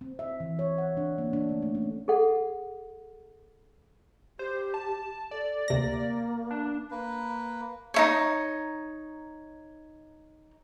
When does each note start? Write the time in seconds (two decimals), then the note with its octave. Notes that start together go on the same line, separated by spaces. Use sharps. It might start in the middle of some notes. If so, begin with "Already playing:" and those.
0.01 C4
0.19 E5
0.40 E3
0.59 C#5
0.78 F#5
0.97 D4
1.18 A#3
1.33 D4
1.49 A3
1.62 A3
1.75 C#4
2.08 G#4 A4 F#5
4.39 G4 C5
4.74 A5
5.31 A4 D5
5.68 D2 C3 A#3 A#6
6.51 D4
6.91 A#3 B4
7.94 D#4 E4 C#5